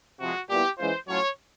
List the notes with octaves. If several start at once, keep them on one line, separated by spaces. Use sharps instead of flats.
C3 F3 G#3 F#4
A#2 G3 B3 E4 G4
E3 G#3 C#4 F4 C5
A2 F#3 A3 C#4 F4 C#5